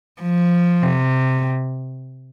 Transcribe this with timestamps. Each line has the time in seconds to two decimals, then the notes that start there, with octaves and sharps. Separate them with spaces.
0.22 F3
0.82 C3